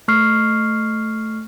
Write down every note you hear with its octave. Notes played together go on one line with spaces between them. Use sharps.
A3 C#6 F6 C7